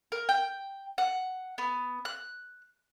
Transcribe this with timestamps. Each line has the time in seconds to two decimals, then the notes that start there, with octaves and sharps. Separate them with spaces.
0.12 A#4
0.29 G5
0.98 F#5
1.58 B3
2.05 F#6